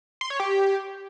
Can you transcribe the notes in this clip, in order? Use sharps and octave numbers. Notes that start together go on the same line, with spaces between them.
C6
C#5
G4